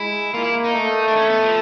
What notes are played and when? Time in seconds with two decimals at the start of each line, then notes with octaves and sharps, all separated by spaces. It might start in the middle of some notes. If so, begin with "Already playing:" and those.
Already playing: G#3 E4
0.34 A#3 F4
0.44 E4
0.65 D#4
0.74 A3
1.08 D4
1.16 C#4
1.29 B3
1.43 F3